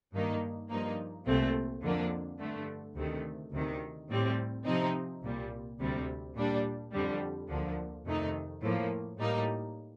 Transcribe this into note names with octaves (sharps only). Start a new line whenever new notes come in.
G2 D#3 A#3 D#4
G2 F3 A#3 D#4
C2 A#2 A3 C4
F2 D3 F3 A#3 D4
G2 D3 A3
D2 C3 D#3 A3
D2 C3 D#3
A2 G3 C4
C3 F3 C4 D#4
C2 A#2 G3
D2 C3 G3
A#2 G3 D4
F2 D3 G3
D2 D3 F3 A#3
F2 C3 D#3 A3 D#4
A2 F3 A#3
A2 G3 A#3 D#4